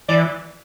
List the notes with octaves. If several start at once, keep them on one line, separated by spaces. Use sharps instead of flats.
E3 D5